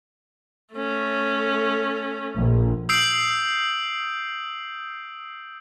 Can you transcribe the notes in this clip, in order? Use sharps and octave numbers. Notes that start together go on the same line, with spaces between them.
A3 C#4
A#1
D#6 E6 G6 C7 D7 F#7